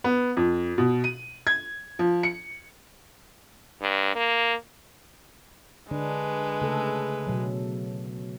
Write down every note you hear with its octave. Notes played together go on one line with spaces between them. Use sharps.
B3
F2
B2
D#7
G#6
F3
C#7
G2
A#3
D3 G#3 D4 B4
C#3 A3 A4
B2 F#3